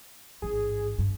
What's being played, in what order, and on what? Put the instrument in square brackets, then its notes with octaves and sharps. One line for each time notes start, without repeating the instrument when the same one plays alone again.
[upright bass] A1 G#2 [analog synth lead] G#4
[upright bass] G2